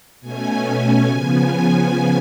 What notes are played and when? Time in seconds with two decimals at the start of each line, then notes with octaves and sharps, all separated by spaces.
0.21 B2 A3 C#4 G#5
0.64 G#5
1.07 C#3 F3 B3 G#5
1.50 G#5